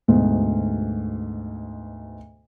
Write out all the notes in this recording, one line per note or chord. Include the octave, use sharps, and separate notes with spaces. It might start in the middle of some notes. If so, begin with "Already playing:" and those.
D2 G#2 B2